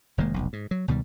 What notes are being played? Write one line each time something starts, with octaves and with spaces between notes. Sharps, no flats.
F1 D#3 G#3 A#3
F1 B1
G#2
F#3
C#2 B2 D#3 G3